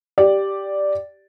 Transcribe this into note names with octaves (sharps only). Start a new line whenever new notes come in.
G4 D5